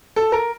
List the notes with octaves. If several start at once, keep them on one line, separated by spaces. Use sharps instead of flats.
A4
A#4